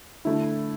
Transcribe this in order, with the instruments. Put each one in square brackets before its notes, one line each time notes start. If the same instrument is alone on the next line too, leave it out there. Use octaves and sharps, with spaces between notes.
[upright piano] D3 A3 E4